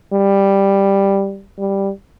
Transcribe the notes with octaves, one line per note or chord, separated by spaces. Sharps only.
G3
G3